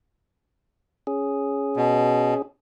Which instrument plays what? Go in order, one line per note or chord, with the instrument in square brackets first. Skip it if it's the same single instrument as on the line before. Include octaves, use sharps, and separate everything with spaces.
[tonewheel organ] C#4 G#4
[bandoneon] B2